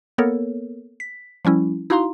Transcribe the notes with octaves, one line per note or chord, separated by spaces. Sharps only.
A#3 B3 A4 A#4 C#5
B6
F3 G3 C#4 E4
D#4 E4 F#4 F5 A#5 C6